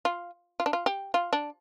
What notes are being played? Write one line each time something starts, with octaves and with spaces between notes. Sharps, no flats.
F4
F4
D4
F4
G4
F4
D4